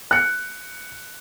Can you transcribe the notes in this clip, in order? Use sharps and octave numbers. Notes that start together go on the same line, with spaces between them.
F#6 C#7